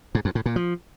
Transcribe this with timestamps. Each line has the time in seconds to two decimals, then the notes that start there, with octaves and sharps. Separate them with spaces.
0.15 G#2
0.25 F2
0.35 A2
0.46 A#2
0.56 F3